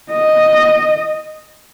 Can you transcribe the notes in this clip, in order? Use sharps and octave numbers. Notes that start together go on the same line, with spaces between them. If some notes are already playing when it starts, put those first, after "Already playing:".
D#5